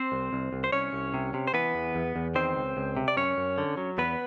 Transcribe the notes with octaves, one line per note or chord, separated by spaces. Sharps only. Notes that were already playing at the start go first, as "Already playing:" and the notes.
Already playing: C4 C5
C2
C2
C2
C5
C2 C#4 C#5
C2
C3
C3
C5
E3 B3 B4
E2
E2
E2
D#3 C4 C5
C#2
C#2
C3
D5
F#2 C#4 C#5
F#2
D3
F#3
E2 B3 B4